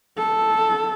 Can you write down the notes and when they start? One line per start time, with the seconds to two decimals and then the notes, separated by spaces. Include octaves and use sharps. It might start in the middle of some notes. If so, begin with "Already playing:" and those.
0.18 A4